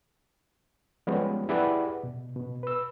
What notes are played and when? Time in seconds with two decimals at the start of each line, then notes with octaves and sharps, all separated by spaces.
1.07 F3 G3 G#3 B3 C#4
1.49 E4 G4 G#4 B4 D5 F#5
2.03 B2
2.35 B2
2.63 B4 E6